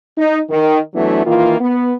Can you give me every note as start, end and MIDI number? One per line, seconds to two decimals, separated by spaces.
0.17 0.39 63
0.50 0.78 51
0.94 1.22 52
0.94 1.22 54
0.94 1.22 57
0.94 1.22 59
0.94 1.22 62
1.25 1.59 51
1.25 1.59 52
1.25 1.59 58
1.25 1.59 65
1.59 1.93 59